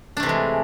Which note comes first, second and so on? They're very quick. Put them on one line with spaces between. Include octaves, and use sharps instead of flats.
D4 A3 C3 E3 G#3